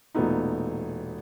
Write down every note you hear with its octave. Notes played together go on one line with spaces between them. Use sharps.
E1 A#2 A3 B3 D#4